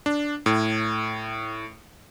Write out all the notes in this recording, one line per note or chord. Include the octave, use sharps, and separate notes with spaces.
D4
A2